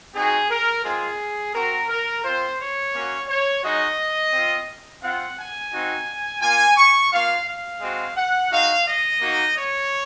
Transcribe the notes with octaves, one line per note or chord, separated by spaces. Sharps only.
C4 D#4 F#4 G#4
A#4
G#3 C4 F4 G#4
C4 F#4 A#4
A#4
C4 F4 C5
C#5
A#3 C#4 F#4
C#5
G#3 D#4 F#4 D#5
C4 F4
C4 F4 F#5
G#5
C4 D#4 F#4
A#3 F4 G#5
C#6
A#3 F4 F5
F5
G#3 C4 F#4
F#5
G#3 D#4 F#4 F5
D#5
A#3 D#4 F#4
C#5